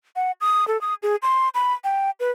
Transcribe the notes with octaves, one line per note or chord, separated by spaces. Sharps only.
F#5
D#6
A4
D#6
G#4
C6
B5
G5
B4